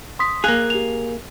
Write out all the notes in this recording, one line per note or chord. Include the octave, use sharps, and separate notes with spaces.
C6 D#6 B6
A#3 G#4 F5 F#6 F7
G4 F7